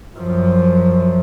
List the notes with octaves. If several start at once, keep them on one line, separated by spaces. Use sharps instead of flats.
F#2 F3